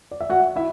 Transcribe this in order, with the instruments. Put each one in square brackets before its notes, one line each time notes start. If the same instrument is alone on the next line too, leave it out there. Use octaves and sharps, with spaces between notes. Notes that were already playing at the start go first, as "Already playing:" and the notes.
[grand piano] D5
E5
F#4 F#5
E4 E5